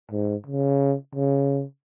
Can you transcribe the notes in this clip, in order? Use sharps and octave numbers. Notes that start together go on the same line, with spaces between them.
G#2
C#3
C#3